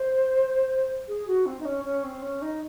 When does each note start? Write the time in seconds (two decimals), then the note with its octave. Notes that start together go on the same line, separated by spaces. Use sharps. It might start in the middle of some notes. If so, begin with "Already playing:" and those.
Already playing: C5
1.08 G#4
1.27 F#4
1.46 C4
1.60 D#4
1.65 C#4
1.84 C#4
2.03 C4
2.22 C#4
2.42 D#4